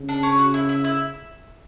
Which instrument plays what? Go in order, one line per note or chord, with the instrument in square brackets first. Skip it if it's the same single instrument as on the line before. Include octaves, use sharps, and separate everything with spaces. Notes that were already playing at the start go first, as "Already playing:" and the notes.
Already playing: [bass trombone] C#3
[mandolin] D4
C#4
F#4
E4
E4
E4